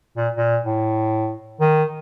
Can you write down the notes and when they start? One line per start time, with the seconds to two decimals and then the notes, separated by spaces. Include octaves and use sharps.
0.17 A#2
0.37 A#2
0.64 A2
1.61 D#3